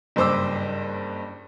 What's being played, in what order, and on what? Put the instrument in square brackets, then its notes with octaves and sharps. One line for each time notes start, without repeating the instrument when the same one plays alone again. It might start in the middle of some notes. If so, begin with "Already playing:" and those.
[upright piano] F#1 G2 C5 D6 E6